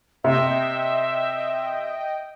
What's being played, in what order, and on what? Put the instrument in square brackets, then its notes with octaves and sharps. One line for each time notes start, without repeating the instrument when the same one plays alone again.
[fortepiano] C3 [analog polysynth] D#5 G5 [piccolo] E5